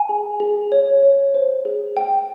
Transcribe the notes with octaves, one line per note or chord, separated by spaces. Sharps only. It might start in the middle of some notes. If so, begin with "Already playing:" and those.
Already playing: G#5
G#4
G#4
C#5
C#5
C5
G#4
G5